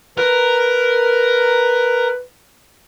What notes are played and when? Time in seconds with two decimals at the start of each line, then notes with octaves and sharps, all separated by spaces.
0.18 A#4 B4